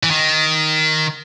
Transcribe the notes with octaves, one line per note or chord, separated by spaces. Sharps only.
E3
D#3